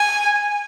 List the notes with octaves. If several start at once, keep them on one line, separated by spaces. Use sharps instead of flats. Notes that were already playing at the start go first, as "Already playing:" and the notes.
Already playing: G#5